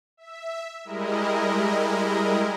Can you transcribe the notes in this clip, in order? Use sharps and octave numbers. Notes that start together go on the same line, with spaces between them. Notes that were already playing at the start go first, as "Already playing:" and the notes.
E5
G3 G#3 E4 A#4 D#5